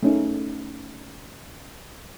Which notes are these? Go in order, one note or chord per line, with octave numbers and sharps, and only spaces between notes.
A3 C#4 D#4